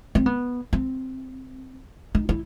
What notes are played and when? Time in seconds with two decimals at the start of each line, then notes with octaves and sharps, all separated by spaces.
0.15 C4
0.26 B3
0.73 C4
2.15 D#4
2.29 E4